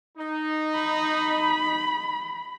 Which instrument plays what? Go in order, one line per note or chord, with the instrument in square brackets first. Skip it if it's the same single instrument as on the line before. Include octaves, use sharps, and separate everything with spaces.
[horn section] D#4
[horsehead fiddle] B5